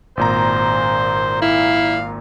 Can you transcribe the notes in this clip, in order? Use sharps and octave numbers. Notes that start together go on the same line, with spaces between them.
G#1 A#2 C5 A#5
E4 F5